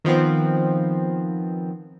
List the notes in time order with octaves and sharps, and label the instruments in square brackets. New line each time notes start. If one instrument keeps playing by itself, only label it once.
[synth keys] D#3 F3 B3 C4